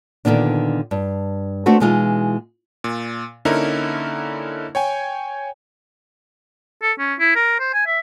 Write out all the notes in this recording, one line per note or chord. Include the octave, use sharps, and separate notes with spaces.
A#2 D3 D#3 B3 D4
G2
A3 C4 D4 F#4 A4 B4
B2 E3 G#3 D#4 F4
A#2
D3 A#3 C#4 D#4 E4 A#4
C#5 G5 G#5
A4
C#4
E4
A#4
C5
G#5
E5